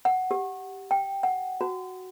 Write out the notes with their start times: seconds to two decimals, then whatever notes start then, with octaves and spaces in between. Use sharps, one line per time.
0.05 F#5
0.31 G4
0.91 G5
1.23 F#5
1.61 F#4